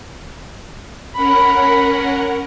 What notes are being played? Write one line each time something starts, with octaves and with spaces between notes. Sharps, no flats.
C#4 A#4 F#5 B5